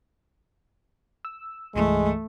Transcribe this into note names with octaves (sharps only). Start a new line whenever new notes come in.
E6
C2 G2 E3 G#3 A3